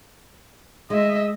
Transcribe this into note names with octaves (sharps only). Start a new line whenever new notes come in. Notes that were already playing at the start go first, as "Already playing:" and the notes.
G#3 D#5 E5